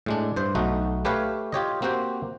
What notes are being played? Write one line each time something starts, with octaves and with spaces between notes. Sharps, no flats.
A2 G#3 D4
G2 C5
B1 A3 D#4 F#4
A3 G4 B4 C#5 F5
F4 G4 C#5 D#5
A#3 C4 F#4 G4 C5